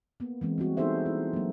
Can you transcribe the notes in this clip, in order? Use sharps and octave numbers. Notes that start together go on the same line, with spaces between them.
A#3 B3
E3 G#3 C4
G3 C4 F#4
B3 D#4 G#4 A4 C5 E5
E4
F#3 A#3